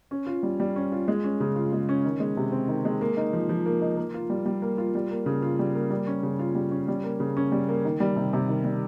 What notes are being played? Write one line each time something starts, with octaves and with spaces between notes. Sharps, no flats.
C#4
F4
G3
G3
C#4
F4
G#3
C#4
C#3
F4
G#3
C#4
D#3
G#3
C3
C4
D#3
G#3
A#3
D#4
F3
F3
A#3
D#4
A#3
F4
G3
G3
A#3
F4
G3
A#3
C#3
F4
G3
A#3
G3
C#4
C#3
F4
G3
C#4
G3
A#3
C#3
C#4
G3
A#3
D#3
G3
C3
C3
D#3
G3